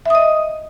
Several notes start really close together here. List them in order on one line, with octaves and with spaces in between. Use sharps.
E5 D#6 D#5